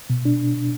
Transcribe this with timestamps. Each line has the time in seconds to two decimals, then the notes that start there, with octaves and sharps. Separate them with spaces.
0.10 B2
0.25 D4